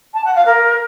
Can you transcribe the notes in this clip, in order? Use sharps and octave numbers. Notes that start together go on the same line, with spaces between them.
A5
F#5
F5
A#4